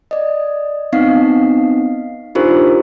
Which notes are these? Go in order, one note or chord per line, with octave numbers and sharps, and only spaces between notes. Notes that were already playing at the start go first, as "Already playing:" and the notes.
D5 D#5
B3 C4 D#4 D#5 F5 C7
D4 D#4 F4 G4 A#4 C5